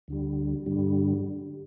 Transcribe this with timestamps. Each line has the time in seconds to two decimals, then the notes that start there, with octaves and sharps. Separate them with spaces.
0.08 D2 D3 G3
0.66 G2 D3 G3